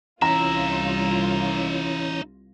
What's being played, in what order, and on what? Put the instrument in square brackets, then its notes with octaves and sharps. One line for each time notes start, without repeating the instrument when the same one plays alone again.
[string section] C2 F4 [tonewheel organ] E3 C#4 [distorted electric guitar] D#4 E5 [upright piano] A#5